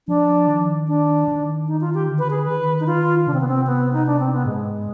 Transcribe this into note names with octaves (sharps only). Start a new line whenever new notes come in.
F3 D4
D#3
D4
D#3
D#4
F4
G4
D3
B4
G#4
D#3 B4
D#4
F4
C3 D4
C4
B3
C4
B3
D#4
D4
C4
B3
G#2 G#3